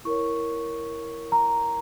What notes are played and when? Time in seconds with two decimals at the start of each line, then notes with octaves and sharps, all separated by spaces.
0.05 E4 A#4 C#5 C#6
1.32 A#5